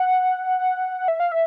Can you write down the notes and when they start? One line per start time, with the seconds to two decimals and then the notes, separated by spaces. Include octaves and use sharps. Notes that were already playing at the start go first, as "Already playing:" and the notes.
Already playing: F#5
1.08 E5
1.20 F5
1.32 E5